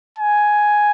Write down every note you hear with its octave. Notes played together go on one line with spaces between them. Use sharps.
G#5